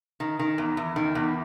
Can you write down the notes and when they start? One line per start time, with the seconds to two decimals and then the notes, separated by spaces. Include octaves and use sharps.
0.20 D#3
0.39 D#3
0.58 E2
0.77 E2
0.96 D#3
1.15 E2